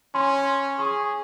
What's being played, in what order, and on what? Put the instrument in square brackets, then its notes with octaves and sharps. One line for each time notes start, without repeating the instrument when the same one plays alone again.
[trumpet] C#4 [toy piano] C6
[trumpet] G#4 [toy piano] C#6